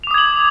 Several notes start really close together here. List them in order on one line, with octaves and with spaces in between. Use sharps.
F7 D6 D#6 G#6 F#7